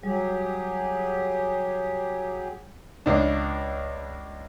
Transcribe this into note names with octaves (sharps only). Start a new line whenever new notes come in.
F#3 G3 G4 G#4
C#2 D4